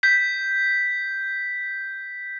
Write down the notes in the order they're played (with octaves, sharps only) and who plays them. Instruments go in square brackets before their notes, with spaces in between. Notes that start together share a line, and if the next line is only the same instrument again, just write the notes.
[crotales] G6 B6